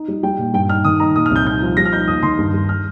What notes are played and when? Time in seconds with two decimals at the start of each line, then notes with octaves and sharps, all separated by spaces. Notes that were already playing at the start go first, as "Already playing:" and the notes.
Already playing: D#4
0.08 G3
0.23 G3 G5
0.39 A#2
0.53 G2 G5
0.69 D#4 F6
0.84 D#3 D#6
1.00 D#4 A#5
1.15 A#2 D#6
1.26 F6
1.31 C2 G6
1.47 D#4 G6
1.62 F3
1.77 G3 A#6
1.85 F6
1.93 D#4 G6
2.08 D#2 D#6
2.23 D#3 C6
2.38 G2
2.54 G2
2.69 F6